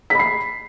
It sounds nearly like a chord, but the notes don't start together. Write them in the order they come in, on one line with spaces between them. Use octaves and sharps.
B6 B5 C7